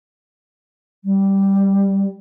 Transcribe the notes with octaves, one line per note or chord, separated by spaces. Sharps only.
G3